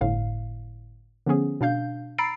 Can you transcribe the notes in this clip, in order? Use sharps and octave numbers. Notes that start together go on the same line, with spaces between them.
G1 A2 F5
D3 F3 B3 C#4 G#4
B2 D4 F5 G6
A#5 B5 E6 A6 C7 D7